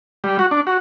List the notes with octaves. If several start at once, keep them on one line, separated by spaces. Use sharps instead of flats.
G3
F#4
D4
F#4